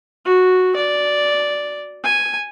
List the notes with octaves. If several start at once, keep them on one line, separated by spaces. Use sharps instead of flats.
F#4
D5
G#5